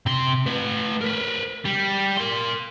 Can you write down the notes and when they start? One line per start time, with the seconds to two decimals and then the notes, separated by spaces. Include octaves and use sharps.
0.06 C3 C6
0.46 A3 B4
1.01 A#4 B4
1.65 G3
2.18 A#4 C6